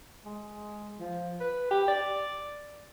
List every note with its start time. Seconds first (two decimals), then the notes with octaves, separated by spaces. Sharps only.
0.25 G#3
0.99 F3
1.40 B4
1.71 G4
1.88 D5